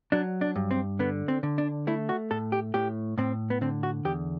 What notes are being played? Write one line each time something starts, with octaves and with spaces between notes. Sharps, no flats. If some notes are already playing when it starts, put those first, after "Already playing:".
F#3 D4
D4
G2
C4
D3 B3
C4
D3
D4
A3 E4
F#4
A2 A4
G4
A2 G4
A2 C4
B3
D3 C4
F#4
E2 G4